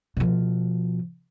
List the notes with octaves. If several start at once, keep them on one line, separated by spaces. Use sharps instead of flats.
B2 F3